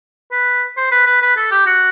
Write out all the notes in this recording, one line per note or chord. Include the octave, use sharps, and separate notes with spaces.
B4
C5
B4
B4
B4
A4
G4
F#4